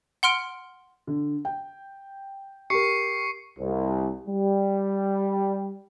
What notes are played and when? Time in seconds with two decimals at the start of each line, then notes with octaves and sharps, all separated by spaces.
0.23 F#5 C6 F6 D7
1.07 D3
1.45 G5
2.70 G4 A#4 C#6 C7 C#7
3.59 C2
4.27 G3